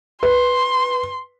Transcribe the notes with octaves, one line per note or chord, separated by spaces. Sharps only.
B4 C6